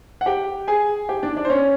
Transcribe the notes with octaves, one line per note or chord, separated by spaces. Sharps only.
F#5
G4 G5
G#4 G#5
G4 G5
D4 D5
D4 D5
C5
C#4 C#5